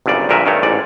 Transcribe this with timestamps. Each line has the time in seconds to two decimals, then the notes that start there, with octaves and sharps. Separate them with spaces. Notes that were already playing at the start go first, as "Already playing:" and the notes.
0.06 G1 C2 F#2 C#3 D5
0.29 A#1 G2 A#2 A#4 B4 E5
0.46 G2 D#3 A3 C#5
0.63 A1 G#2 D5